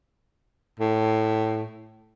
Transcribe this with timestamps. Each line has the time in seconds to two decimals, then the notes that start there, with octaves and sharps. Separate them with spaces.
0.79 A2